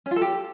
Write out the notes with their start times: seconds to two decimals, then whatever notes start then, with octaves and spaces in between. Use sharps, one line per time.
0.06 C#4
0.11 F4
0.16 A4
0.21 G4